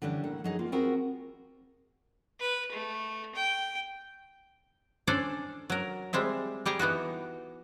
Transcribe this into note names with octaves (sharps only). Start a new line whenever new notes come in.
D3 E3 G3 C#4 D4
A2 A#3 F#5
F#3 D#4 G#4
E2 A#3 F4
B3 C4 F4 F#4 G#4 A#4
B4
A3
G5
C#4 D4 A4 C5 D5
F#3 A#4
G3 G#3 C4 E5
G3 G4 G#4 A#5
E3 B3 D#4 F#4